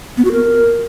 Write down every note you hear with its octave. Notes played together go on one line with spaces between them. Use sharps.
B3
F#4
A#4